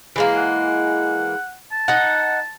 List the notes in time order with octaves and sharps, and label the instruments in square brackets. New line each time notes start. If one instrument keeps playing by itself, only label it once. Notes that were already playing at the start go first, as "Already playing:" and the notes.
[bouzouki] E3 G#3 A#3
[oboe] F#5
A5
[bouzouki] D#4 F#5